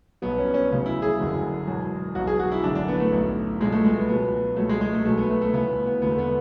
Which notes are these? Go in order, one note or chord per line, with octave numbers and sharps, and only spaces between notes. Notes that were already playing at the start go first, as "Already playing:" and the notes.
B1 B2 F#3 B3
C#4
C#4
D2 C#3 F#3
E4
G#4
F#1 F#2 D3 F#3
E1 E2 B2 F#3
B1 B2 F#3 F#4
G#4
F#4
E4
G#1 F#2 D3 F#3 D4
D4
B3
A3
B1 A2 F#3
C#2 B2 F#3 G#3
A3
G#3
B3
C#2 B2 F#3 B3
C#2 B2 F#3 A3
G#3
G#3
A3
B1 B2 F#3 A3
B3
A3
A3
D2 C#3 E3 B3
B3
E1 D2 D3 B3
A3
B3